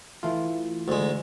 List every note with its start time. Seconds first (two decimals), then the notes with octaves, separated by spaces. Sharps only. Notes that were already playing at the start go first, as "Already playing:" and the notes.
0.23 E3 A3 F4
0.88 D2 G#3